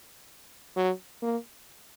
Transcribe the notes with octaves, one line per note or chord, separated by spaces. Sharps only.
F#3
A#3